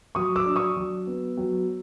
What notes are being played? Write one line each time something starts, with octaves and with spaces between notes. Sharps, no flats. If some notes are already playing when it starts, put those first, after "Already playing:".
F#3 C#6 D#6
D6 E6
D4
C#6 D#6
F#3
B3
F#3